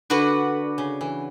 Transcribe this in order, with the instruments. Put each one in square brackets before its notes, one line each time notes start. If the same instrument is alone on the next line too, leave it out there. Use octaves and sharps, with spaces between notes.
[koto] D3 [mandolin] D4 F#4 B4 F#5
[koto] C#3
E3